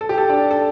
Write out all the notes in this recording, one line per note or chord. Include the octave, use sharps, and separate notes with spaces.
A4
G4
A4
D4
A4